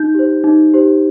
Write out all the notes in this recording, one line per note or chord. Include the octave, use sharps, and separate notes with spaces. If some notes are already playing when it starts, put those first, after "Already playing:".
Already playing: D#4 G6
G4 C5
D#4
G4 C5